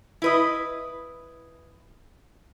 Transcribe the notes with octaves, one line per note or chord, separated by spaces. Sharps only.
E4 B4 D#5